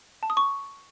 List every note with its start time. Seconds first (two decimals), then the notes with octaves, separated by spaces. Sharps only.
0.23 A5
0.30 D#6
0.37 C#6